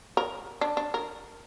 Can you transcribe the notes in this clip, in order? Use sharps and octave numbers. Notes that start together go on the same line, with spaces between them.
A#4
D4
D4
A#4